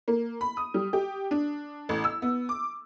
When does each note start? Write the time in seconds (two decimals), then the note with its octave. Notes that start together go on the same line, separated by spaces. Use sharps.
0.08 A#3
0.41 B5
0.57 D#6
0.74 G3
0.93 G4
1.31 D4
1.89 A1
2.04 E6
2.22 B3
2.49 D6